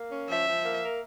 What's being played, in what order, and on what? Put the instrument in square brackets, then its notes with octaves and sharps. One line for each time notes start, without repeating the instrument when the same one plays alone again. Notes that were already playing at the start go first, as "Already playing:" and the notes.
Already playing: [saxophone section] A#3
C#4
[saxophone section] F3 [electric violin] E5
[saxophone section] F3
A#3
A#4